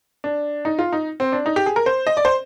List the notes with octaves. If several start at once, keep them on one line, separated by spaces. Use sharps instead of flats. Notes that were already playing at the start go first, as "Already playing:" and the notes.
D4
D#4
F4
D#4
C4
D4
D#4
G4
G#4
A#4
C5
D#5
D5
C5